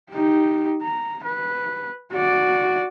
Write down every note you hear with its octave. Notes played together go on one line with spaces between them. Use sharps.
D#4 G4
A#5
B4
F#4 D5